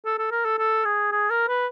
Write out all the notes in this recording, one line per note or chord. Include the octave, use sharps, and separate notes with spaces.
A4
A4
A#4
A4
A4
G#4
G#4
A#4
B4